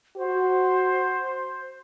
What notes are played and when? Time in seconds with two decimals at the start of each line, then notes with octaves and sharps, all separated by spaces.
0.17 F#4 C5